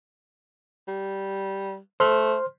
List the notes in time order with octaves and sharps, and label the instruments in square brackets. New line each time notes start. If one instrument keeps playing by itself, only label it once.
[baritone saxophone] G3
[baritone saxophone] A3 [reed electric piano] C5 C6 F6